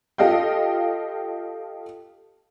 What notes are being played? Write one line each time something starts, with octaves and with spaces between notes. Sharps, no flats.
F4 G4 A4 D#5 F5 G5